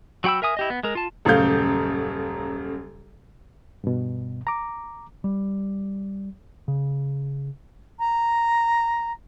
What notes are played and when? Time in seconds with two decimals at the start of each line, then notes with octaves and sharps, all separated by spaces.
0.24 F#3 F#4 G5 B5 E6
0.42 A#4 E5 G#5 D#6
0.57 E4 G4 D#5
0.70 B3
0.83 G#3 A#4
0.95 F4 A5
1.25 D#1 F#2 C#3 A3 F5 G6
3.84 G2 B2
4.47 A#5 D6
5.24 G3
6.68 C#3
7.99 A#5